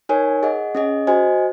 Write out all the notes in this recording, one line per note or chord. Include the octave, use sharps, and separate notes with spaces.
D#4 A#4 C#5 G#5
G#4 D#5 F#5
C#4 G#4 D#5
F#4 C5 D#5 G#5